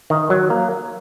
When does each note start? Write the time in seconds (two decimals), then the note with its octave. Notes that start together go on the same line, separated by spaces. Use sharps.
0.10 D#3
0.30 F#3
0.50 A#3